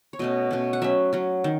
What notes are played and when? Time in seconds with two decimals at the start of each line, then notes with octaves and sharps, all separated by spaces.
0.13 C#5
0.19 B2 A3 C#4 D#5
0.51 B2 A3 C#4
0.73 F#5
0.82 F#3 C#4 E5
1.13 F#3 C#4
1.44 D#3